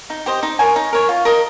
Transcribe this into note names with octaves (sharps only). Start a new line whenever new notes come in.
D#4
G4 C5 D#5
D#4
A#4 C#5 G#5
D#4
A#4 C#5 G#5
F4
A#4 D#5 A#5